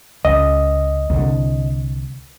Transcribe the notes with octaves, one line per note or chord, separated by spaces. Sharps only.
C#2 D#5
C2 D3